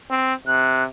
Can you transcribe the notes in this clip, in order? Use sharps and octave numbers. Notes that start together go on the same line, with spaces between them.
C4
C3 F#6